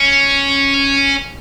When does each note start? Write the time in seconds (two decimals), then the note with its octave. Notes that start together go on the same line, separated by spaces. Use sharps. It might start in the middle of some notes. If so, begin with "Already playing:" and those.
Already playing: C#4